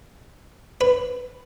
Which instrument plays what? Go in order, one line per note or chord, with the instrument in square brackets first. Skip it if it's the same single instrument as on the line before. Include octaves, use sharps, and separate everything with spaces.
[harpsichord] B4